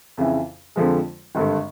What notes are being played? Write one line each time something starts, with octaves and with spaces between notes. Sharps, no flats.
F2 C#3 E3
F2 D3 F3 G#3
G#1 G2 D3